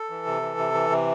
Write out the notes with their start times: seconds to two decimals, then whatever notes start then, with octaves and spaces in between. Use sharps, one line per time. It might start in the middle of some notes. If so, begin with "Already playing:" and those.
Already playing: A4
0.10 E3
0.26 C3
0.42 E3
0.58 C3
0.74 E3
0.90 C3